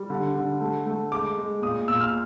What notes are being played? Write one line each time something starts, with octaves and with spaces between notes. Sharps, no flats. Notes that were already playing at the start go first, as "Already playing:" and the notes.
Already playing: G3
D3
D3
A3
A3
G#3 D6
G#3
A#2 D#6
A#2 E6
F6